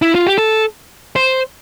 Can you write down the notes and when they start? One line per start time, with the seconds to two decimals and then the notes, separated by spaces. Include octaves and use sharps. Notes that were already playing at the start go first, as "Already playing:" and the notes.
0.02 E4
0.15 F4
0.26 G4
0.38 A4
1.16 C5